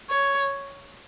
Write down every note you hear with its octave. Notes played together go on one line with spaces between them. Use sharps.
C#5